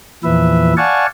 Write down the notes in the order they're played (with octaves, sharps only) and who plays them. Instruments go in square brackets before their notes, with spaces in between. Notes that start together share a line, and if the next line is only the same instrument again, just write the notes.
[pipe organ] E2 A#2 E3 F3 B4 E5
D5 F5 F#5 G#5 A5 C#6